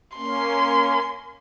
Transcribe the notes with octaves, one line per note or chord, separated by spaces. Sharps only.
A#3 C#4 C6